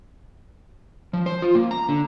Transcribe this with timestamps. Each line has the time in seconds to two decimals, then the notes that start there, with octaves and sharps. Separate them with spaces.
1.13 F3
1.26 C5
1.42 F4
1.55 A#3
1.71 A#5
1.89 D3